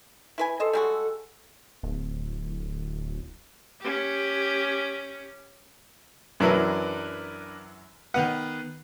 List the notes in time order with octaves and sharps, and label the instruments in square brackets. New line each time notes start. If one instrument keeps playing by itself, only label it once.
[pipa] E4 B4 G#5
[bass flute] A4 [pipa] C5 D#5
[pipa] G3 G#3 F#4
[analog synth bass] D1
[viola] C#4 G4
[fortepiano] F#2 E3 F#3 [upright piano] D4 A#4 B4
[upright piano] D#3 B3 B4 [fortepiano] F#5